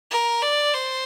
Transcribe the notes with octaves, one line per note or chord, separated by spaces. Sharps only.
A#4
D5
C5